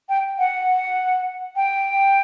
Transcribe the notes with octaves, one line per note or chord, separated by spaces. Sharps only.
G5
F#5
G5